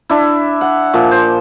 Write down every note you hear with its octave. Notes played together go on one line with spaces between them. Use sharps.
D4 E4
F#5
A#2 F3
C5